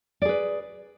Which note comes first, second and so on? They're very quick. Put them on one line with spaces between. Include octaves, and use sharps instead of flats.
D5 G#4 B4